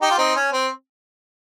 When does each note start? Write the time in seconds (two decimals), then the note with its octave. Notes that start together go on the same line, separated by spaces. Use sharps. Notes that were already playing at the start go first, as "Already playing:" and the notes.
0.02 D#4 G4
0.11 F4
0.18 C4 D#4
0.36 C#4
0.52 C4